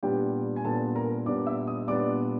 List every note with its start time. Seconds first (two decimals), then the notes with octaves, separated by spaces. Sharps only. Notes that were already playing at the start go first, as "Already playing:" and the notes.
0.03 A#2 G3 B3 D4 G4 G5
0.56 G#5
0.64 A#2 G3 B3 D4 A4 A5
0.96 A#4 A#5
1.26 A#2 G3 B3 D4 D5 D6
1.46 E5 E6
1.67 D#5 D#6
1.88 A#2 G3 B3 D4 D5 D6